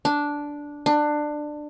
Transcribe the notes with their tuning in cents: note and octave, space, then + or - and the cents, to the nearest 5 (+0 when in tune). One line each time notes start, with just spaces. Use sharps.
D4 -5
D4 +20